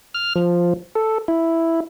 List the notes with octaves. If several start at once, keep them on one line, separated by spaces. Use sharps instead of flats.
F6
F3
A4
E4